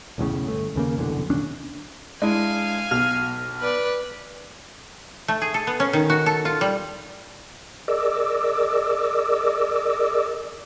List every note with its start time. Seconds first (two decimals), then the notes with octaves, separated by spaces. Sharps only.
0.18 B1 E2 A2 C#3
0.48 G1 A3
0.75 D#2 C#3 A#3
0.97 F1 B1 E2 D3
1.30 D#1 D#2 C#4 D4
2.22 G#3 D4 E4 F5 G#5
2.91 B1 F6
3.61 B4 D5
5.28 A3
5.42 G#4
5.54 A4
5.67 B3
5.80 C#4
5.93 D#3
6.10 F#4
6.26 A4
6.45 F4
6.61 G3
7.88 G#4 A#4 D5 D#5 D6 E6